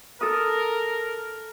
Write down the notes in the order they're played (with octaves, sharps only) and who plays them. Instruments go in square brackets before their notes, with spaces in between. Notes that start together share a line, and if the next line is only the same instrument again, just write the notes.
[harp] A4 D#6 [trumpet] A#4